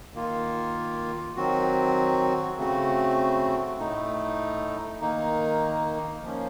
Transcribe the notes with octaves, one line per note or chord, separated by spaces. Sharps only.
D#3 A#3 F4
D#3 F#3 C4 F#4
C#3 A3 C4 F#4
A2 A3 D#4
D#3 A#3 D#4
F3 A#3 C#4